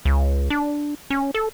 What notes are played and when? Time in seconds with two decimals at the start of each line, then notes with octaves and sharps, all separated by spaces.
0.05 C#2
0.50 D4
1.10 C#4
1.34 A4